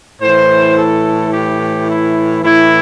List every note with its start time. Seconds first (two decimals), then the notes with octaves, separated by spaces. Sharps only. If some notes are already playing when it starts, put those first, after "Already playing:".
0.22 A2 E3 C5
0.77 A4
1.33 G4
1.88 E4
2.44 A2 E3 E4